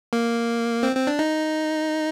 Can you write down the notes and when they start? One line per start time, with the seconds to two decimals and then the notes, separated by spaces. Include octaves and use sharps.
0.13 A#3
0.83 C4
0.96 C4
1.07 D4
1.19 D#4